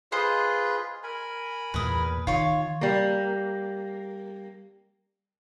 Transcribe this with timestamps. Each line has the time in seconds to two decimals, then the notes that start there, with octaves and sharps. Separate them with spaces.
0.12 F4 G#4 B4 C5 D#5 D#6
1.03 A#4 G#5 B5
1.74 E2 A#2 B4 D#6
2.27 D#3 F4 C#5
2.81 G3 A#3